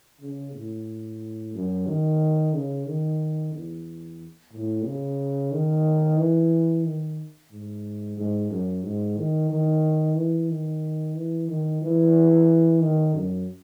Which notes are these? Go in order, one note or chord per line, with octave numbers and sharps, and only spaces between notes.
C#3
A2
F#2
D#3
C#3
D#3
E2
A2
C#3
D#3
E3
D#3
G#2
G#2
F#2
G#2
D#3
D#3
E3
D#3
E3
D#3
E3
D#3
F#2